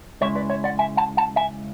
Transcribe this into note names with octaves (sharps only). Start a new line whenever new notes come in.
C#2 C#3 G#3 C#4 E4 C#5 E5
B4 D5
C#5 E5
D5 F#5
E5 G#5
F#5 A5
F#5 A5
E5 G#5